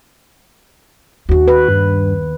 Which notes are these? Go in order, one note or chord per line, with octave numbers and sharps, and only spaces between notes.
D#2 D4 F#4
B4
G2